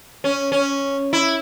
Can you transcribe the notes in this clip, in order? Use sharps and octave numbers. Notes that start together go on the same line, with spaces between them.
C#4
C#4
E4